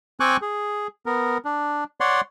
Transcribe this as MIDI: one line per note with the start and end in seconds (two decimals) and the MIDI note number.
0.20 0.37 60
0.20 0.37 79
0.20 0.37 80
0.20 0.37 85
0.20 0.37 86
0.20 0.37 90
0.42 0.87 68
1.06 1.38 59
1.06 1.38 70
1.45 1.84 62
2.01 2.21 73
2.01 2.21 74
2.01 2.21 78
2.01 2.21 84